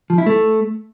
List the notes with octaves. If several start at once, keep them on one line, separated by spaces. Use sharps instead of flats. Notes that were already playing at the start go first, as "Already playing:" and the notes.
F3
E4
A3